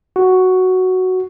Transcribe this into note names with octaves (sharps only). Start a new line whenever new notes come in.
F#4